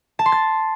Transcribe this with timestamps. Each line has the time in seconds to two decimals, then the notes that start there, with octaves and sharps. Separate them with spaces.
0.19 A5
0.26 C6
0.32 A6